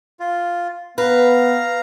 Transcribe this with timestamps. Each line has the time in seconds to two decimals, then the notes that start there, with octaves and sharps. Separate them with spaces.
0.20 F4
0.98 B3 B4 F5 A#5